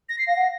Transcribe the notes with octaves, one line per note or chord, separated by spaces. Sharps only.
A#6
C7
F5 A#6
F#5